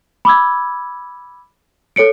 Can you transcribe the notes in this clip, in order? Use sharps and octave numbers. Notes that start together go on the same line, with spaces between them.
B5 D6 E6 G#6
A4 C#5 C#7 D7